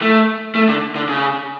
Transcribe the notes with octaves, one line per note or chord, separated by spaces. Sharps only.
A3
A3
D3
D3
C#3